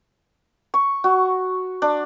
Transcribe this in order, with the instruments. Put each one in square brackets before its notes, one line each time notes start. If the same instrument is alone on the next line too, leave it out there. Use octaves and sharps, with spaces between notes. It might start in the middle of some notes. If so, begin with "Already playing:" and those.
[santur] C#6
F#4
D4